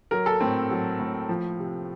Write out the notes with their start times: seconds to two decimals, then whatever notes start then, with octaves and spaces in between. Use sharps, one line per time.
0.11 F#3 A#4
0.26 A4
0.41 A2 C4
0.71 F#3
0.99 A2
1.29 F3
1.59 C3